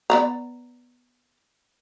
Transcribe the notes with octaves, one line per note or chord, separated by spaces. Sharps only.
B3 D5 A#5